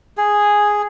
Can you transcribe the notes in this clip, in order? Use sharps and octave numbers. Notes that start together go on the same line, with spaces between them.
G#4